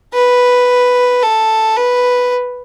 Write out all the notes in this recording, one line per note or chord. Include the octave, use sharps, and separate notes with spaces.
B4
A4
B4